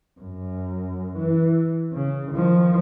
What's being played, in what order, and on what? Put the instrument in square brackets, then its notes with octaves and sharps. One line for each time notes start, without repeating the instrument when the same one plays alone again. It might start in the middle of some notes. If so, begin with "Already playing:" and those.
[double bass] F#2
E3
C#3
D#3 F3